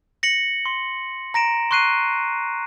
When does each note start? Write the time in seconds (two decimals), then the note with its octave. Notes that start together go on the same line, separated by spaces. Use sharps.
0.23 A#6 C#7 F#7
0.66 C6
1.34 A#5 A#6 D7 E7
1.71 C6 C#6 F#6 C7 D#7